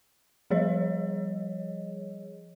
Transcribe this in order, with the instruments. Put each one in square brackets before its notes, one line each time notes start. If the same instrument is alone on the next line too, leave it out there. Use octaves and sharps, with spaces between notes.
[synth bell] F3 G3 G#4 C#5 D#5